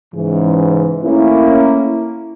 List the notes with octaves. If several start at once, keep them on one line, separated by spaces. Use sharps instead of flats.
G#2 C#3 E3
A3 A#3 C#4 E4